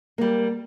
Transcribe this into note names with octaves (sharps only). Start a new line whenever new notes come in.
G3 A#3